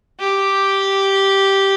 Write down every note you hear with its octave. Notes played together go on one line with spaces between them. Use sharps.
G4